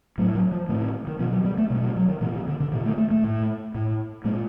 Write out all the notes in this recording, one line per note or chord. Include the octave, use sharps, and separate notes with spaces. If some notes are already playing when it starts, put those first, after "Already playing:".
A2 F#3
F#3
F3
A2 D#3
D#3
D#3
B2 F3
F#3
G3
A3
B2 G3
G3
F#3
D#3
A#2 E3
D#3
D3
D3
A#2 D#3
A3
A3
A3
A2
A2
A#2 G#3